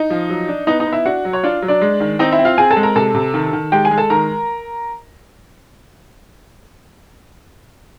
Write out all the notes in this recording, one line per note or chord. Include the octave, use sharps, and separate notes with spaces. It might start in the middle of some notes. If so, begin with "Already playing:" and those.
Already playing: D#4 D#5
F3
F#3
D4
B3 D#4 D#5
D#4 D#5
B3
E4 E5
D4 F#4 F#5
F#3
C#5
D4 F4 D5
F#3
D4 D5
G#3
D#3
C4 D#4 D#5
E4 E5
C4
F4 F5
C4 G#4 G#5
A4 A5
G#3
A#4 A#5
C3 A4 A5
C3
D#3
D#3
G#3 G4 G5
G#4 G#5
G#3
A4 A5
D#3 A#4 A#5